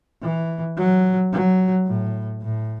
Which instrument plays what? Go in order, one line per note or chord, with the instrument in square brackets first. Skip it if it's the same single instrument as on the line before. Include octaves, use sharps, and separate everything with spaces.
[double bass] E3
F#3
F#3
A2
A2